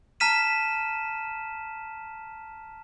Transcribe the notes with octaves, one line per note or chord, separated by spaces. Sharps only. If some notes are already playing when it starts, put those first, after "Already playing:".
A5 A#5 F6 B6 D#7 E7